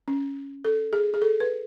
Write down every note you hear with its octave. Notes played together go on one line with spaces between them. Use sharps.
C#4
A4
G#4
G#4
A4
B4